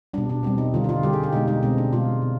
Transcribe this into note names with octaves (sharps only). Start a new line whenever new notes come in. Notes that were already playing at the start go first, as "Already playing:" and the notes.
B2 G3 D4
D4
B2 G3 C4
D#4
D3 G3 F4
D#4
F4
D3 G3 G4
G#4
G4
B2 G#3 D#4
D#4
B2 G#3 C4
D4
B2 G#3 F4
B2